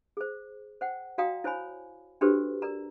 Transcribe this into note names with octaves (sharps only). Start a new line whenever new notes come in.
G#4 C5
C5 F#5 G5
F#4 D5 F5 G5 A#5 D#6
E4 C5 C#5 G#5 B5
D4 F#4 G4 A4 B4 C5
A#4 D5 A#5